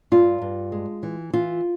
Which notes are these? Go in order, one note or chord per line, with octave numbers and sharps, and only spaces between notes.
G2 F4
G2
G#3
E3
E3 F4